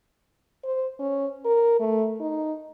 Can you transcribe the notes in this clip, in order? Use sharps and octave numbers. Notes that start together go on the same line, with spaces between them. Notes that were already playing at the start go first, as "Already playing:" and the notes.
C5
C#4
A#4
A3
D#4